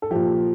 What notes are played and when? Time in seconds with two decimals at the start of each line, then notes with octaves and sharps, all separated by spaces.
0.02 A4
0.11 A#2 F3 G4